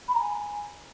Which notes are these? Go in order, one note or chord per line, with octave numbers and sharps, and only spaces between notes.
B5
A#5
G#5